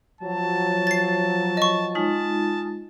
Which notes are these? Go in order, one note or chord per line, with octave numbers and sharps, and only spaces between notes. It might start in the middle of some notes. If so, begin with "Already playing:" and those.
F3 F#3 A5
A6 C7
D#5 C#6
G#3 D#4 F4 A5